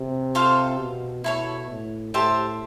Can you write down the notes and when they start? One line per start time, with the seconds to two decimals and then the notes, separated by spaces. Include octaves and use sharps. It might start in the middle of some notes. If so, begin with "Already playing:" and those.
Already playing: C3
0.35 F4 A4 C5 F5
0.80 B2
1.24 B2 E4 A4 C#5
1.69 A2
2.14 A2 G4 C5 E5 A5